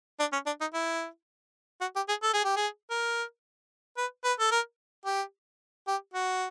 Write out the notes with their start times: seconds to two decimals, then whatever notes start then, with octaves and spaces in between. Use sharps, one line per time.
0.20 D4
0.33 C#4
0.46 D4
0.61 D#4
0.74 E4
1.81 F#4
1.96 G4
2.09 G#4
2.23 A4
2.33 G#4
2.44 G4
2.56 G#4
2.90 A#4
3.97 B4
4.24 B4
4.40 A4
4.52 A#4
5.05 G4
5.87 G4
6.14 F#4